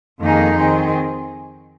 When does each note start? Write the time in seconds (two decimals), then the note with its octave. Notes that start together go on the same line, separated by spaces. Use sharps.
0.20 F2 D#3 A#3 D#4 G#4
0.56 D#3 C4 G#4